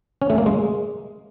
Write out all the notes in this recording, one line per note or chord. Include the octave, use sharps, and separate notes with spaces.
C#4
A3
A#3
G#3